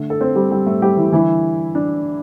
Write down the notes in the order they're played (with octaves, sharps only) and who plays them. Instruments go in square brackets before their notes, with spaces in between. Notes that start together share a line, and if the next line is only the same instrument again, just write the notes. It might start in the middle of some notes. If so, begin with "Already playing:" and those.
Already playing: [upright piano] D3 A3
A4
C4 C5
G3 G4
G3 G4
A3 A4
G3 G4
E3 E4
D3 E3 G3 E4
D4